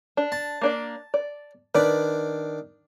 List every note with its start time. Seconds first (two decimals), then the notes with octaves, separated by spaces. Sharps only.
0.17 D4
0.32 A5
0.62 A#3 D4 D5
1.14 D5
1.75 D#3 D4 B4 D5